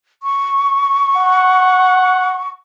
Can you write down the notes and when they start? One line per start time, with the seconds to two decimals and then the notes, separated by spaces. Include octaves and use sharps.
0.23 C#6
1.17 F#5